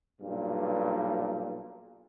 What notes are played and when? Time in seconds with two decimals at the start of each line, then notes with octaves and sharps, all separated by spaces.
0.21 B1 G2 A#2